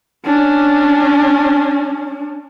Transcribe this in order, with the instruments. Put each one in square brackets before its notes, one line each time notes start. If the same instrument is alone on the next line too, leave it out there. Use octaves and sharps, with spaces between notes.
[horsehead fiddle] C#4 D4